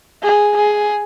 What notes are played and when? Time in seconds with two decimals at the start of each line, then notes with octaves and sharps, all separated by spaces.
0.23 G#4
0.57 G#4